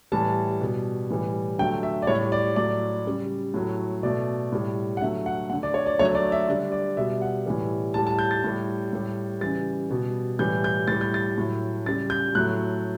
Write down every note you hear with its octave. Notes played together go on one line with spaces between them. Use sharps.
A2 E3 G3 A5
B2 G3
A2 E3 G3
D3 F#3 A3 G5
E5
D5
A2 G3 C#5
D5
A2 F#3 A3 D5
C#3 G3
A2 F#3 A3
B2 A3 D5
A2 G3
F#5
D3 F#3 A3 E5
F#5
D3 A3 F#5
D5
C#5
D5
D3 F#3 A3 C#5
D5
E5
D3 G3 D5
D5
B2 G3 E5
F#5
A2 E3 G3
A2 G3 A5
A5
G6
A6
A2 G3
A2 G3
C#3 E3 G3 A6
B2 G3
A2 E3 G3 G6
G6
A2 G3 A6
G6
A6
A2 F#3 A3
C#3 G3 A6
G6
A2 F#3 A3 F#6